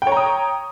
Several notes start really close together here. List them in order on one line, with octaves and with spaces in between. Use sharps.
G5 C#5 A#5 D#6